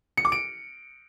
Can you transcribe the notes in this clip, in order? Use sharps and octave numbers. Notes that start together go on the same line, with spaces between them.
C#7
D6
D7